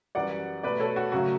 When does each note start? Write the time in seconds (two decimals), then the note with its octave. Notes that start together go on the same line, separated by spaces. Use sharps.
0.15 F#2 E3 G3 D5 F#5
0.63 B2 A3 B4 D5
0.80 A4 C#5
0.96 F#4
1.12 F#2 C#3 F#3 A3 F#4